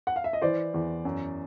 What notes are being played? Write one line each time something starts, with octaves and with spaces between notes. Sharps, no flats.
F#5
F5
E5
D#5
E3 C5 D5
E2
F#2